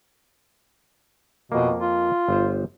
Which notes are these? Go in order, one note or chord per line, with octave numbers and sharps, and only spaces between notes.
F2 B2 A#3
F4
G1 C5